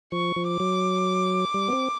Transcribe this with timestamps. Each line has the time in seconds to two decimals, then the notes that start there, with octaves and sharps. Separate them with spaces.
0.12 F3 C#6
0.36 F3
0.48 D6
0.60 F#3
1.54 G3
1.68 B3
1.72 C4